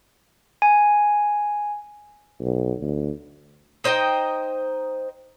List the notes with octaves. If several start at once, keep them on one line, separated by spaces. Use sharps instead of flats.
G#5
B1
D2
D#4 C5 D#5 G5